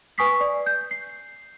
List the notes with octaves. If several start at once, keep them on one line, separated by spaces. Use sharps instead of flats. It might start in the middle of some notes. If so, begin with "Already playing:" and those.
B4 G#5 C#6 D#6 B6 C7
D5
G6
C7